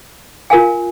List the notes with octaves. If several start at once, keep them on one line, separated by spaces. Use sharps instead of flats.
F4 A#4 F5 G#5